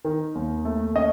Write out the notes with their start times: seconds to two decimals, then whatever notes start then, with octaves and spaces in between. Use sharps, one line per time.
0.05 D#3
0.35 D#2
0.65 A3
0.95 C#4 D#5